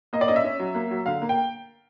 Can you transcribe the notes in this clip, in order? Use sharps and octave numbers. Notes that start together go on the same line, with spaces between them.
A#3 D#5
D5
C#4 D#5
E5
C#4
F#3
A#3
F#3
D3 F5
A#3
G5